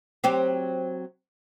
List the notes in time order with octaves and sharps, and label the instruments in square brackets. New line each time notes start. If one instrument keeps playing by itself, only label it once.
[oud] F#3 C4 G4